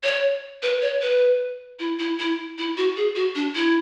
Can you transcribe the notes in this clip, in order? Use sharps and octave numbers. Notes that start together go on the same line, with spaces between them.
C#5
B4
C#5
B4
E4
E4
E4
E4
F#4
G#4
F#4
D4
E4